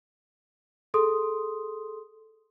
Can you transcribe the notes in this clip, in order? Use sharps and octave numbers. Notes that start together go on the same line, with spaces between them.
G#4 A4 C6 D#6